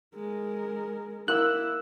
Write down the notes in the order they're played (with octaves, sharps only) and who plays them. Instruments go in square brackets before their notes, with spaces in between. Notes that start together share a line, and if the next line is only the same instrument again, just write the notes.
[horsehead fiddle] G#3 A#4
[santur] A#3 E6 [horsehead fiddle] E4 [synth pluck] F#6